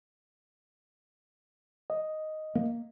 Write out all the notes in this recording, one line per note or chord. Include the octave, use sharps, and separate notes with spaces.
D#5
A#3